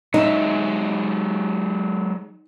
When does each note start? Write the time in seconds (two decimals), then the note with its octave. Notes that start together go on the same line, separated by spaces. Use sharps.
0.14 F#3 G#3 D#4 E5